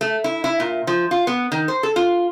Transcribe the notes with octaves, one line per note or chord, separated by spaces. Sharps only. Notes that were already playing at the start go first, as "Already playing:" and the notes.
A3
E4
E4
A#2
F3
F4
B3
D#3
C5
A4
F4